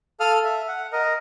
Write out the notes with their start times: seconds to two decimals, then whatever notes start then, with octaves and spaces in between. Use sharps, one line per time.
0.20 A4 F5 D#6 F6
0.44 E5
0.68 F#5
0.92 A#4 D#5